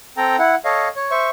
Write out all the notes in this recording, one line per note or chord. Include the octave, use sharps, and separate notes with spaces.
C4 A4 G5 A#5
E4 F#5
A4 C#5 D#5 F5
C#5
C5 E5 C#6